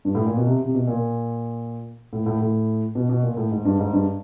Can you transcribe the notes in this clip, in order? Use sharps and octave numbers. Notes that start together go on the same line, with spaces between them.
G2
A2
A#2
B2
C3
C3
B2
A#2
A2
A2
A2
B2
B2
A#2
A2
G#2
G2
G#2
G2